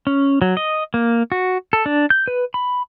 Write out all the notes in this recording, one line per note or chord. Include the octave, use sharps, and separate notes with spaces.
C#4
F#3
D#5
A#3
F#4
A4
D4
G6
B4
B5